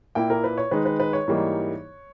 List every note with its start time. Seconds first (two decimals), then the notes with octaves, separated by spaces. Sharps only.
0.15 A#2 A#3 E4 G5
0.30 A#4
0.44 B4
0.58 C#5
0.71 D#3 G#3 D#4 B4
0.85 B4
1.00 B4
1.13 C#5
1.28 G#2 E3 G3 A#3 D#4